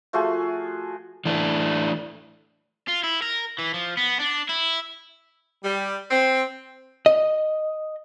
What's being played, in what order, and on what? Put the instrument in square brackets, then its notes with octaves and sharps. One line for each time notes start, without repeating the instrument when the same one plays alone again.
[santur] F3 A3 F#4 G#4
[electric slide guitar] E3 A3 D4
[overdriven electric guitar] F4
E4
A#4
E3
F3
B3
D4
E4
[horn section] G3
C4
[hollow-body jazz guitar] D#5